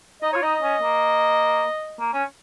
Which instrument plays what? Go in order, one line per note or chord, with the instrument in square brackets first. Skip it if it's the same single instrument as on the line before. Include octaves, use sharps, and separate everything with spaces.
[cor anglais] D#4 [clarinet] D#5
[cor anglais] F4 [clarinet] C#5
[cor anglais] D#4 [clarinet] D#5
[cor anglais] C#4
A#3
A#3
C#4